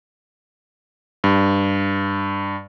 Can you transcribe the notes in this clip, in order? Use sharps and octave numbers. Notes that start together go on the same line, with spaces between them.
G2